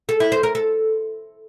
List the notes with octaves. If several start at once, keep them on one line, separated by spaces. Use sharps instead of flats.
A4
E4
C5
A#4
A4